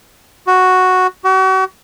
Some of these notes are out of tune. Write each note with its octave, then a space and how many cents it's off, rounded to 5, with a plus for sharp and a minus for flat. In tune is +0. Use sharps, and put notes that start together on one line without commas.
F#4 +0
F#4 +40